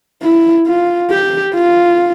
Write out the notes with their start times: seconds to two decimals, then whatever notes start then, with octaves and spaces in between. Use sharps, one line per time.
0.23 E4
0.67 F4
1.11 G4
1.55 F4